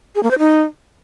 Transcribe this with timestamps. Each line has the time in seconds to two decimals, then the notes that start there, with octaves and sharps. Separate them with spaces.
0.15 G#4
0.23 A#3
0.31 C5
0.39 D#4